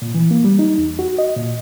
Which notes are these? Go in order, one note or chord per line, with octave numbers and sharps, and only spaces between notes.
A#2
E3
A#3
G3
D#4
E2
F#4
D#5
A#2